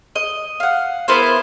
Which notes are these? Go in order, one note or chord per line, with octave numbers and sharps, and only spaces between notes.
D#5
F5 F#5
B3 E4 A#4 C5